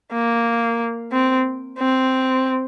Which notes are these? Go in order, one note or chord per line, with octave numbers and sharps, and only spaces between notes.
A#3
C4
C4